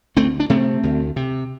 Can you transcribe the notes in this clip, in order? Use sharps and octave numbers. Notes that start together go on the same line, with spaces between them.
D2 A3 C4
D4
C3 A3 C4
D2
C3